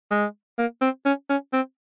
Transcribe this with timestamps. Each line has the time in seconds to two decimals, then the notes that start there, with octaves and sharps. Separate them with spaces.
0.11 G#3
0.58 A#3
0.82 C4
1.06 C#4
1.29 C#4
1.53 C4